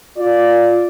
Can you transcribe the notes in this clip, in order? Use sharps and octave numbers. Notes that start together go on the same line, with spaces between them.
F4 D5